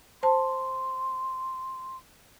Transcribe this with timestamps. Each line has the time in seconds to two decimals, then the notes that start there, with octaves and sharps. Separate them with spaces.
0.23 C5 A5 C6